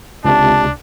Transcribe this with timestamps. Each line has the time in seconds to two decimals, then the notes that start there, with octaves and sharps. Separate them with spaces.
0.25 C#2 C3 D4 A5